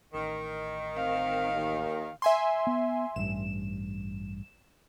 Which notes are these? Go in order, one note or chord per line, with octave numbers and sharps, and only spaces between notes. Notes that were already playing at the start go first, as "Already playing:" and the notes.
A1 D#3
C4 F5
D#2
E5 G#5 C6
B3
A1 G2 E7